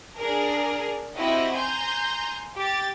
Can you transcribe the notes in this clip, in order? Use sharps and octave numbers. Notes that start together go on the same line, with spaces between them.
D4 G#4 A#4
C4 E4 F#4 G4 D#5
G#5 A#5 C6 G6
G4 A6